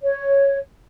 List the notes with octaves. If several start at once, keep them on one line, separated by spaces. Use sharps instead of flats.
C#5